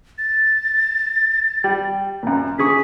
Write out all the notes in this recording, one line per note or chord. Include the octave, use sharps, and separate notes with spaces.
A6
G3
F#2 A#2
C#3 G#4 C#6 B6